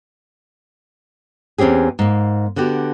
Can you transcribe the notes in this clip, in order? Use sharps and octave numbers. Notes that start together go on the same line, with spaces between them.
E2 C4 C#4 G4 G#4
G#2 A#3
D3 B3 F#4 G4